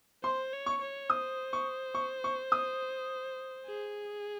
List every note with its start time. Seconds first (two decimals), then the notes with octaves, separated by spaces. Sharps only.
0.24 C5 C6
0.53 C#5
0.66 C#6
0.81 C#5
1.09 C5 D#6
1.53 C#6
1.95 C#6
2.24 C#6
2.52 D#6
3.66 G#4